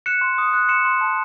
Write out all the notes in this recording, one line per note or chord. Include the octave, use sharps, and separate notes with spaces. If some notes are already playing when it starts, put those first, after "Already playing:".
F#6 C#7 E7
C6
D#6
F#6
C6 C#7 E7
C6
A5